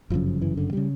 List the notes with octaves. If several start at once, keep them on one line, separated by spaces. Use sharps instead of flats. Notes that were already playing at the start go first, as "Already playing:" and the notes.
G1 F#2 C#3 F3
F3
E3
D3
C#3 G3